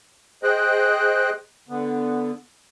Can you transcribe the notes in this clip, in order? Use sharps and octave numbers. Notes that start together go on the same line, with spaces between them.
G#4 C5 D#5 G5 F#6
D3 B3